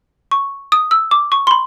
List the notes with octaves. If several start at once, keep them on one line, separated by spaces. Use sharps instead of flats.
C#6
D#6
E6
D6
C#6
C6
B5